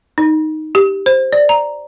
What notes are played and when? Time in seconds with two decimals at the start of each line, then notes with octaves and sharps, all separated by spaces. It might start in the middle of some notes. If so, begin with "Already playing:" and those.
0.18 D#4
0.75 G4
1.06 C5
1.33 D5
1.49 A#5